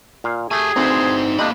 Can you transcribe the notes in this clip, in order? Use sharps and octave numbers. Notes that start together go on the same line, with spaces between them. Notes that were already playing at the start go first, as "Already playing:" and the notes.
A#2 F5
A3 G4 G#4 G#5
D2 E3 C4 D#4 C5
F2 C3 A#3 D4 D#5 G5 B5